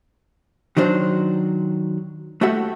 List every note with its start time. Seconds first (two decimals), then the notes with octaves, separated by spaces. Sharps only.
0.77 D#3 F#3 D4 C5
2.41 A3 F#4 G4 A4 E5 F#5